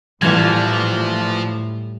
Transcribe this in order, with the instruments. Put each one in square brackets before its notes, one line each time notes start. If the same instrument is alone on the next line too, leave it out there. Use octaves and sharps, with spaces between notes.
[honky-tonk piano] A#1 E3 G#6 [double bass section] A2 [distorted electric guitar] F3 [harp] G3